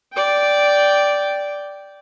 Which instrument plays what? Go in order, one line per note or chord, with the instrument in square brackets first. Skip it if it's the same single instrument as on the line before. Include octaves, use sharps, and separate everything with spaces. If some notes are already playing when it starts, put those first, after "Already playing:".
[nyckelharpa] D5 G5